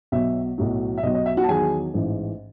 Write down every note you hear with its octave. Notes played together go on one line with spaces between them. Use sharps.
B1 B2 F#3 E5
B1 A2 F#3
E5
B1 B2 F#3 D#5
D#5
E5
F#4 F#5
A5
E2 D#3 F#3 G#4 G#5
A1 G#2 E3